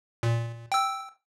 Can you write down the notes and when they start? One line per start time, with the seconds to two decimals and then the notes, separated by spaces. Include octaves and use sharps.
0.23 A#2
0.72 G5 E6